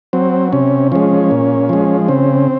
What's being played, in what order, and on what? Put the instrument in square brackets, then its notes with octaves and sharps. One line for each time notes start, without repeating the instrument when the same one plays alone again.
[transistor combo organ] F#3 C4
C3 C#4
F3 G#3 C#4
A#2
F3 G#3
C#3 C4